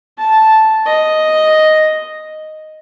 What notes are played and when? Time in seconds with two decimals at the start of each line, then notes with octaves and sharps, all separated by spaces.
0.18 A5
0.86 D#5